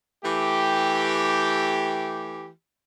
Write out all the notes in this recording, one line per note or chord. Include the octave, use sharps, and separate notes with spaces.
E3 A3 G4